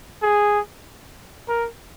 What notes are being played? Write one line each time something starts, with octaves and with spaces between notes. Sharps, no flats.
G#4
A#4